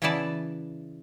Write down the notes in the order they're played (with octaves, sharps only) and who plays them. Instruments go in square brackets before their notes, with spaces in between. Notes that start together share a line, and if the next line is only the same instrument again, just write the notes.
[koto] C#3 E3 B3 E4 D5 A5